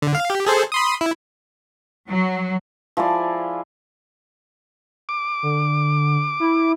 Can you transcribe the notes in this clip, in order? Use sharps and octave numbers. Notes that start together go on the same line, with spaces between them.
D3
F5
G4
G#4 A4 C5
B5 C6 D#6
E4
F#3
F3 E4 G#4 D5
D6
D3
E4